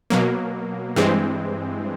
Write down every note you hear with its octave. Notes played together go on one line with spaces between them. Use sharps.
B2 F#3 A#3
G2 E3 G#3 C4